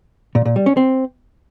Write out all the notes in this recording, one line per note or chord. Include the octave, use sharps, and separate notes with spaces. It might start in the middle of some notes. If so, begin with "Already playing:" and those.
A#2
A#2
G3
C#4
C4